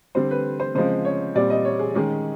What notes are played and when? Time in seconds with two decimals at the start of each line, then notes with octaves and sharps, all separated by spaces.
0.15 D3 G3 C4 C5
0.31 B4
0.60 C5
0.75 C#3 F3 G#3 C4 C5
1.05 C#5
1.35 A#2 G3 C4 D5
1.50 D#5
1.65 C#5
1.79 G#4
1.94 D#3 G#3 C#4 G#4